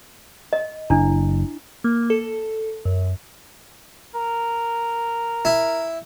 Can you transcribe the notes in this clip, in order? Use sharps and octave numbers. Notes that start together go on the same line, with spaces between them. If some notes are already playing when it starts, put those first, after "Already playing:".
D#5
F#1 D4 E4
A#3
A4
F#2
A#4
E4